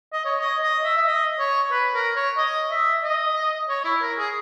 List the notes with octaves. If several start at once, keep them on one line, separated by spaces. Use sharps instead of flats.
D#5
C#5
D#5
D#5
E5
E5
D#5
C#5
B4
A#4
C#5
D#5
E5
D#5
C#5
E4
A#4
G#4